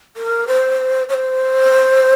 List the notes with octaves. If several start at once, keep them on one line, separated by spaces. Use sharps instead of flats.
A#4
C5
C#5
C5